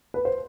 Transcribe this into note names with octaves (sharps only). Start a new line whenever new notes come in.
B4
C5